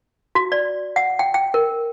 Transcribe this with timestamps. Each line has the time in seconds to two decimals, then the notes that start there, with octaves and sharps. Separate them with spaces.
0.35 F#4
0.52 D5
0.96 F#5
1.19 G5
1.34 G5
1.54 A#4